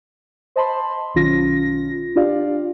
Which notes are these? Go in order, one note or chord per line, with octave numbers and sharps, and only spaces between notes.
C5 D#5 A5 B5 C6
B1 D#3 C#4 F4 A#6
D4 F4 G4 D5 F5